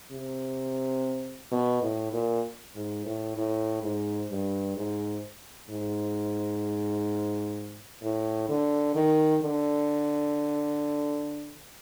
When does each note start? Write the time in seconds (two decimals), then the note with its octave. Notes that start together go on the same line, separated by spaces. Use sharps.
0.11 C3
1.51 B2
1.82 A2
2.13 A#2
2.75 G#2
3.06 A2
3.37 A2
3.83 G#2
4.30 G2
4.77 G#2
5.70 G#2
8.03 A2
8.49 D3
8.95 D#3
9.43 D3